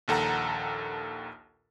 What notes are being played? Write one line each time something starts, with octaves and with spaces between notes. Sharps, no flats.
A#1 D#2 A4 F#5 A#5